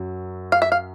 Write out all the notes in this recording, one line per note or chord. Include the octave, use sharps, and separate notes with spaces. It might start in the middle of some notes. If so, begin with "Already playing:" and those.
Already playing: F#2 F#3
F5
E5
F5